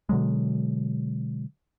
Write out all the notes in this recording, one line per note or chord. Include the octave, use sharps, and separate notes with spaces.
B2 D3 F#3 G#3